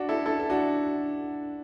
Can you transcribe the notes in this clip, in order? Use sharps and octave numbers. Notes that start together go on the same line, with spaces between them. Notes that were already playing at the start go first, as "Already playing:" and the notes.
Already playing: D4 F#4
E4 A4
E4 A4
A4
D4 F#4